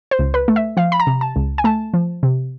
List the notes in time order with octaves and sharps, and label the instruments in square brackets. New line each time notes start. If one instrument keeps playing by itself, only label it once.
[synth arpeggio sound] C5
C#2
B4
A3
E5
F3 F5
B5
A#5
C3
A5
C#2
G#5
A3 A5
F3
C3